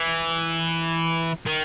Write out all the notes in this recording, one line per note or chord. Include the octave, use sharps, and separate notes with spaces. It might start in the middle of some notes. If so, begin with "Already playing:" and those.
Already playing: E3
D#3